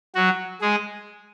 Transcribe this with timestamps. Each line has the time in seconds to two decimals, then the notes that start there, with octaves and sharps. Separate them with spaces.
0.15 F#3 F#4
0.62 G#3 G#4